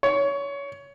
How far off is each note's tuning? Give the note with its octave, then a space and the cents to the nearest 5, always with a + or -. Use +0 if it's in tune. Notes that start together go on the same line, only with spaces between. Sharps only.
C#5 +20